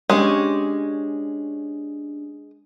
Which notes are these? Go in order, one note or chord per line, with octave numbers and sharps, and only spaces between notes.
G#3 C#4 D4 G4 C#5